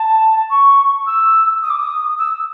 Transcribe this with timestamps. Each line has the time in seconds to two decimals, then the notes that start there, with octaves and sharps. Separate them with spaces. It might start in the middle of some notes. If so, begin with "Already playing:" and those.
Already playing: A5
0.50 C#6
1.07 E6
1.63 D#6
1.70 D6
1.78 D#6
2.19 E6